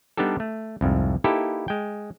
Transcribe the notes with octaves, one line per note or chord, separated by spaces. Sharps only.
G3 B3 D4 D#4 G4 A4
A3
C2 F2 G#2
A#3 D#4 E4 G4 A4 B4
G#3 G5